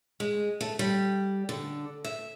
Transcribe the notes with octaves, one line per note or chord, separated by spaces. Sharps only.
G#3
A3
G3
D3
E5